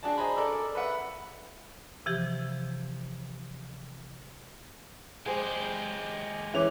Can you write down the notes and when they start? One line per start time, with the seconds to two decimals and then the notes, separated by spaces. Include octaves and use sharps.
0.03 D4 F#4 G#4 D5 A5
0.18 G#4 C5 D#5 G#5 A#5 B5
0.36 A4 A#4 D5 E6
0.75 B4 E5 F#5 B5
2.06 C3 E3 F3 G4
5.26 G#3 G4 G#4 C5
6.54 E3 C#4 G#4 C#5 D6 F7